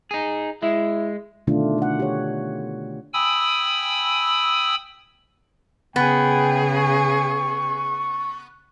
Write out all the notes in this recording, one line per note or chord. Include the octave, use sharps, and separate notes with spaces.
D#4 G#4
G#3 E4
B2 D3 D#3 A3 D4 F4
A3 F#5
G4 C#5
G5 G#5 B5 D#6 E6
C#3 B3 G#4 G5
C#6